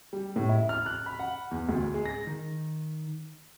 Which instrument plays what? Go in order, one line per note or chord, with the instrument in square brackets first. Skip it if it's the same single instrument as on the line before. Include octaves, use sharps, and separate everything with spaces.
[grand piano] G3
A2
E4
F6
F#6
B5
F#5
E2
D2
G#3
A#6
[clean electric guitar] D#3